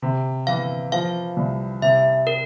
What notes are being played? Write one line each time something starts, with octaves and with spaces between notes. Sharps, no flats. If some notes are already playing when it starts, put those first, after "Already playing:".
C3
E3 F5
F3 F5
C2
C3 E5
A#4